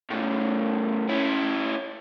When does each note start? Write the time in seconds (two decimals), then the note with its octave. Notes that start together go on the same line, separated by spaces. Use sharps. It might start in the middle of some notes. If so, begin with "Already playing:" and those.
0.10 A2 C#3
1.09 C#4 E4